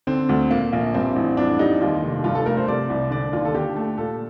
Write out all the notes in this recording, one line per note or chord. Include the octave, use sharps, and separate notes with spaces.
D3 C4
D2
A#2 A#3
A#1 A#3
G2 C4
A1
F2 D4
G3 D#4
D#2 F4
F1
G2 F4
A4
A3 A#4
C5
C3 D5
C2
D3 D5
D#2 F4
A4
D3 G4
A3
A#2 A4